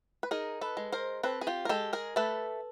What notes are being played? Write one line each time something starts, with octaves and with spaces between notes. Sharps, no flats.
B4
D#4 G#4 A#4
A4 B4
G#3
A#4 C5
C4 A4 B4
G#4
F4 G4
A#4
G#3 G4 A4
G#4 A#4
A3 A4 B4